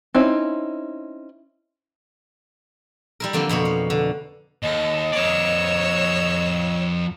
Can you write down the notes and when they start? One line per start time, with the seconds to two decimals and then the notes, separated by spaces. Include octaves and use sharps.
0.14 C4 C#4 D#4 E4
3.20 G3 E4 A#4
3.33 D3 F3 A#3 C4
3.49 F2 B2 A#3 C#5
3.65 F5
3.90 D3
4.63 D#2 A4 D#5
5.12 F2 C#5 D5 E6